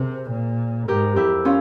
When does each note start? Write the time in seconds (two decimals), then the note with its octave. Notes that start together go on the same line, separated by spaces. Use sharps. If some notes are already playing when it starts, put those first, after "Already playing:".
Already playing: C3 G#4 A#4 C5
0.31 A#2
0.88 G#2 G4 A#4
1.16 F2 E4 G4
1.45 C#4 F4